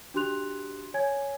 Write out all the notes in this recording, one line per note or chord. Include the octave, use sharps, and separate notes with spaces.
D4 F#4 G4 C6 F#6 F7
C#5 G#5 G#6